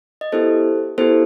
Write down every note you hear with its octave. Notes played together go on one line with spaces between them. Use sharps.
D#5
B3 E4 G4 A4 C5
B3 E4 G4 A4 C5